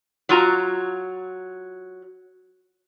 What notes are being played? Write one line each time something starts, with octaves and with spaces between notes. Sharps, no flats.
F#3 F4 A#5